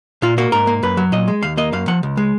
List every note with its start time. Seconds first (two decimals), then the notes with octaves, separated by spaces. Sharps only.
0.22 A#2 F4
0.38 A#3 F#4
0.52 G#2 A#4
0.67 A#3
0.83 F#2 B4
0.97 F#3
1.12 A#2 D#5
1.28 G#3
1.42 D#2 F5
1.57 A#3 D#5
1.73 F#2 F5
1.88 F3 F#5
2.03 C#2
2.17 G#3